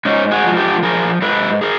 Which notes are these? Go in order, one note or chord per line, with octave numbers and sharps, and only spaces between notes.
G#2 C#4 D#4
F#4 G#4
F3
G4 A4
F3 G#4 A#4
G#2 A4 B4
G#4 A#4